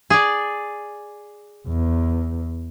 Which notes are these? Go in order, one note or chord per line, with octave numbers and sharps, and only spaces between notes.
G#4 D5
E2